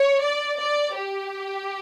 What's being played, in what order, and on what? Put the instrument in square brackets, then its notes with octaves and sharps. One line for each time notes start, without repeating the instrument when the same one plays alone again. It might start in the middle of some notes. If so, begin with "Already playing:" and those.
Already playing: [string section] C#5
D5
D5
G4